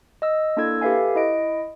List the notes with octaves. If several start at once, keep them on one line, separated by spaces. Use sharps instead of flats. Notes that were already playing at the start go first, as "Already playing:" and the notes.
D#5 E6
A#3 D4 E4 A4 E6 G#6
G4 A4 B4 E5 F5 G#5
E4 D#5 D7